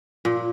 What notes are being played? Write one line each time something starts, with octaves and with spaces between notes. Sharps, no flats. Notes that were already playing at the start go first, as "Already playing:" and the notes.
A#2